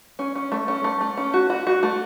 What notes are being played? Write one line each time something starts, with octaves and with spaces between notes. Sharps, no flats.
C#4
C#4
A3
C#4
A3
A3
C#4
F#4
F#4
F#4
A3